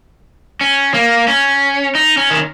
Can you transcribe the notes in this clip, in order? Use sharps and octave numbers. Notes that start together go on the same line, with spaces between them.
C#4
A#3
C#4
D#4
C#4
D#3